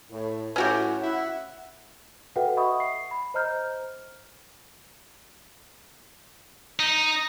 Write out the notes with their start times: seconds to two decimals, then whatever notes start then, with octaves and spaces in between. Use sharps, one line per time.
0.11 A2
0.56 A2 C#4 F#4 G4
1.01 E4 F#5
2.36 F#4 A4 B4 E5 F#5 G5
2.56 D#5 E5 F#5 B5 C#6 D#6
2.80 C7
3.11 B5
3.34 C5 D#5 A#5 F6 G6
6.79 D#4